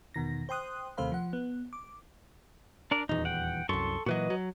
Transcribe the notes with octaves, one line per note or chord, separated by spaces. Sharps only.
E2 B2 D#3 A#6
C5 G5 C6 D#6 F#6
D#2 C3 A3 C5 F5 B5
F3 F#5
B3
D6
D4 A#4 D5
D#1 E2 D#4
F#5 G5
C2 F#2 A4 C6 C#6
A#2 E3 F#3 F#4 B4 D#5
F#3